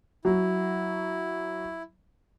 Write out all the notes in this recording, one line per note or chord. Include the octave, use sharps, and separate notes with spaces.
F#3 E4